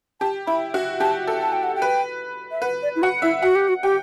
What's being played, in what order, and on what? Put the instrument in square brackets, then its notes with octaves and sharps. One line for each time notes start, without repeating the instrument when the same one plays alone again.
[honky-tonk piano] G4 [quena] A5
[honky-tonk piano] E4 [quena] B5
[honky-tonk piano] F#4
[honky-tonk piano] G4 [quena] A5
[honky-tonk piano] A4
[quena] A5
G5
F#5
G5
[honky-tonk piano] B4
[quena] E5
[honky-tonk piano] B4 [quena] F#5
[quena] D5
E4
[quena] F#4 [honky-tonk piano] F#5
[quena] E4 [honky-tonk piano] E5
[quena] F#4 [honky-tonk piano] F#5
[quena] G4
F#4
[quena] G4 [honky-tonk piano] G5